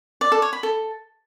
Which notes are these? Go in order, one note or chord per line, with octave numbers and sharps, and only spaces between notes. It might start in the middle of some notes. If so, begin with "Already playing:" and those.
D5
A4
C#5
B5
A4